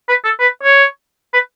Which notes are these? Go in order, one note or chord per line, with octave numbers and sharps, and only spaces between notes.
B4
A4
B4
C#5
B4